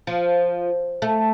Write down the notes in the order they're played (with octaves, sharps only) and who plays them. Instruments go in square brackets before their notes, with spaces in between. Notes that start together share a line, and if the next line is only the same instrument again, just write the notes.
[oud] F3
A3